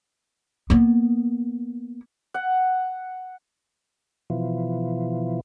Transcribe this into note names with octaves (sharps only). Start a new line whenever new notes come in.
A#3 B3
F#5
B2 E3 F3